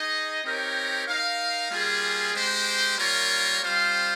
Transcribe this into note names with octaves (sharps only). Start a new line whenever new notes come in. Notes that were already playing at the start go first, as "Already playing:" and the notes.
Already playing: D#4 G#4 D#5
C4 D#4 G4 A#4 C#5
D#4 A#4 F5
G3 A#3 F4 G#4
G#3 C4 G4 C5
G3 A#3 F4 A#4 C#5
G3 C4 F4 C5 F5